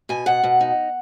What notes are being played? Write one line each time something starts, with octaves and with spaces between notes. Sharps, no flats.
B2 G#5
B2 F#5
B2
D#4